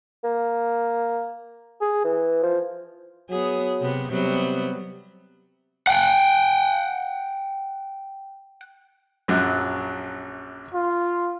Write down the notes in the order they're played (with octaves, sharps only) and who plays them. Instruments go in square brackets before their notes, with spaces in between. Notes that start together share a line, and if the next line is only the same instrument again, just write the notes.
[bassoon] A#3
G#4
E3
F3
[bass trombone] F#3 [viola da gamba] B3 G#4
[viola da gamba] C3 B3
[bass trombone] C3 [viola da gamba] F#3 G3 B3
[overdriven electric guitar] F#5 G5
[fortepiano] A#1 F#2 F#3
[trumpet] F4